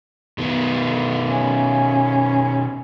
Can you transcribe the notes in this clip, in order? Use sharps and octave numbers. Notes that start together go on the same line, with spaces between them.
B2 D#3 B3
D3
C#4